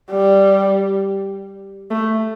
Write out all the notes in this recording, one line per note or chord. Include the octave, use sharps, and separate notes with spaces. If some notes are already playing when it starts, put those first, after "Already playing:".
G3
A3